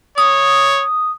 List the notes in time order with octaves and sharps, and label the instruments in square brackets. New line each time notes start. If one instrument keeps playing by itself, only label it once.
[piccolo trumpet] C#5 [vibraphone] D#6